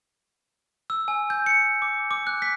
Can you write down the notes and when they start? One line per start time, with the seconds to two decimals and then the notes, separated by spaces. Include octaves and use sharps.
0.90 E6
1.08 G#5
1.30 G6
1.46 C#7
1.82 D6
2.11 D6
2.27 F#6
2.42 B6